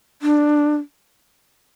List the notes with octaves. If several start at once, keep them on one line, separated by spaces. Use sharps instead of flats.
D4